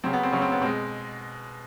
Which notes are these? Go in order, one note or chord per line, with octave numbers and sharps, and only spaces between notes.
C#3 F#3 C4
B3
C4
C#3 F#3 C#4
C4
B3
B2 G#3 C4